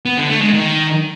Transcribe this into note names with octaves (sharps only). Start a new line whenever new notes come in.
B3
D3
A3
G#3
D#3